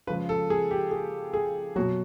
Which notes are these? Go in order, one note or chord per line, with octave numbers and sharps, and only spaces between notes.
C#3 F3 G#3 B4
A4
G#4
G4
G#4
G#4
B2 F#3 F#4